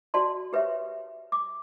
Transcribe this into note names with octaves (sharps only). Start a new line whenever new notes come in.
F#4 D5 A5 C6
G4 B4 C#5 E5
D6